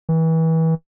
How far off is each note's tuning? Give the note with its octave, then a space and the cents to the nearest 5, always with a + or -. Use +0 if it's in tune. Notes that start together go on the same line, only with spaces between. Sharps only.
E3 -30